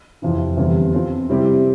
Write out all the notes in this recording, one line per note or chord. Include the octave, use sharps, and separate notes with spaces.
F2 C3 E3
E2 D3 G3 C4
F3 C4 F4
C3 G3 C4 E4 G4